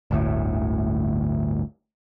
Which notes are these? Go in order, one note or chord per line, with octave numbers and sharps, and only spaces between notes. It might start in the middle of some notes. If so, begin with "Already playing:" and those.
G1 D2 A2